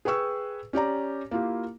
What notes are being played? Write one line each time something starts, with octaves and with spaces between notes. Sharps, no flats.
G#4 B4 G5 C#6 E6
C#4 G4 D5 A#5
A#3 E4 F4 G4